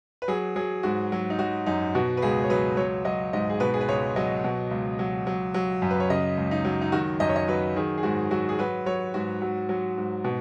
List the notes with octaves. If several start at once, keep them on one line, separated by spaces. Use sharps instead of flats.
B4
F#3 G#4
F#3 G#4
G#2 F#4
F#3
D#4
F#3 F#4
F#2 D#4
B2 F#4
B4
C#2 G#4
C#5
F#3 B4
F#3 C#5
F#3 D#5
G#2 D#5
G#4
B2 B4
G#4
B4
C#2 C#5
F#3 D#5
B2
C#2
F#3
F#3
F#3
F#2
B4
C#5
C#3 D#5
C#2
D#4
F#3
D#4
D#3 F#4
F#2 D#5
C#5
D#5
F#3 B4
D#3 G#4
G#4
G#2 F#4
F#3 F#4
G#4
F#3 B4
F#3 C#5
G#2 F#4
F#3
F#3
G#2
B2